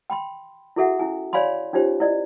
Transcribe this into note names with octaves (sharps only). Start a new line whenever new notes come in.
G5 B5 C6
E4 F#4 G#4 A4 E5 F#5
C#4 E4 G#5
C#5 D5 F5 G#5 B5 C6
C#4 D#4 F4 G4 C5 C#5
E4 D5 D#5